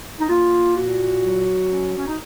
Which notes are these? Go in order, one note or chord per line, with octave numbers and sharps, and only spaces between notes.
D#4
A#3 F4
A#2 F#4
F#3
C#4
C#4
D#4